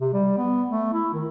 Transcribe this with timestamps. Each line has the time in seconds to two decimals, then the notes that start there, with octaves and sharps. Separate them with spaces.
0.01 C3
0.13 G3
0.37 B3
0.70 A3
0.93 E4
1.14 D#3